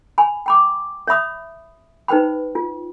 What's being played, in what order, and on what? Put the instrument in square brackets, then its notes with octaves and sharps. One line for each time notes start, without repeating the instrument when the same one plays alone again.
[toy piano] G#5 B5
G5 B5 D6
C#5 E5 B5 D#6
D#4 B4 C5 G5 B5
F4